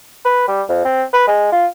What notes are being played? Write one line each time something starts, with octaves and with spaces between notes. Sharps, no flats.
B4
G3
F2
C4
B4
G#3
F4